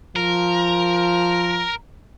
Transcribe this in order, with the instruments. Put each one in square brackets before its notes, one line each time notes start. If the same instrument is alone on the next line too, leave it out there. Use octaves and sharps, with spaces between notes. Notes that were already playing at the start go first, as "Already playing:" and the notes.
[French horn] F3 [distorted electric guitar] A#4